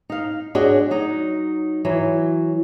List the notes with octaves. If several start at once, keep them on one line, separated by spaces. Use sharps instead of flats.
D#4 F5
D4 F#4 G#4 C#5 D#5
F#3 D#4
E3 F#3